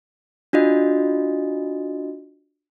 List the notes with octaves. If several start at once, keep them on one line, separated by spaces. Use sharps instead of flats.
D4 F4 F#4 D#5